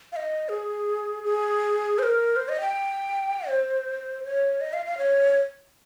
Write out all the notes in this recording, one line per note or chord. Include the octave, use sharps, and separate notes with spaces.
F5
D#5
G#4
G#4
C5
A#4
C5
D#5
G5
C5
C#5
D#5
F5
F5
C#5